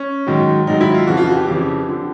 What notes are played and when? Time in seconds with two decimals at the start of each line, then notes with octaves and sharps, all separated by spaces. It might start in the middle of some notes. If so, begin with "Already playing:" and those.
Already playing: C#4
0.27 G#2 D#3 F#3
0.67 G#2 D#3 F#3 D#4
0.81 E4
0.94 F4
1.07 F2 C#3 E3 F#4
1.17 F4
1.27 F#4
1.37 G4
1.47 F2 C#3 E3
1.88 D3 F3